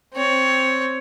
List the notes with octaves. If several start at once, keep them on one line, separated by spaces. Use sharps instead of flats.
C4 C#5